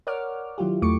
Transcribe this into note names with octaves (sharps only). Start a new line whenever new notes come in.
A#4 C#5 D5 F#5 D6 F6
D#3 F#3 E4 F4 G4
E2 A3 C#6 D6 C#7